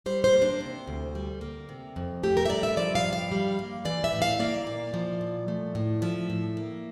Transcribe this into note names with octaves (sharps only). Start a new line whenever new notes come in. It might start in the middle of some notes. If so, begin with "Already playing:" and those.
G3 C5
C5
A#3
D4
C3
D2
G3
A#3
C3
F2
A3 G4
A#4
E5
G2 D5
E5
F3 D5
F5
G2
F5
G3
A#3
E3 D5
E5
A2
F5
A#3 D5
A#2
F3
A#2
A3
A2
F3 E5
A2
A#3